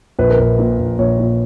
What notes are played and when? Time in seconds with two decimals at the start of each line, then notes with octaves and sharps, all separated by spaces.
0.19 A#1 B4
0.30 A#4
0.39 A#1 B4
0.59 A#2
0.79 A#1
0.99 A#1 C#5
1.19 A#2